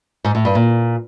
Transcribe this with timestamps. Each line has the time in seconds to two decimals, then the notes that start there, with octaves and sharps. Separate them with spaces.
0.24 G#2
0.35 A2
0.45 G2
0.55 A#2